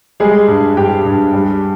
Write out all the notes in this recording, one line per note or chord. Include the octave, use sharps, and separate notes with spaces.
G3 G#3 G#4
G2
G2 G4 G5
G2
G3